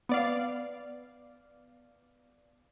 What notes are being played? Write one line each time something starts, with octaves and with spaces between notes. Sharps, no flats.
B3 D5 F5